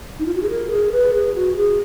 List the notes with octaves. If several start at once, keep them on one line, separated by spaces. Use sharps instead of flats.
D#4
F4
F#4
G#4
A#4
G#4
B4
G#4
F#4
G#4